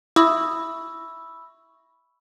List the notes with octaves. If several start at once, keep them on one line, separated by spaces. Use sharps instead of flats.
E4 E5 B5 C#6 D#6 E6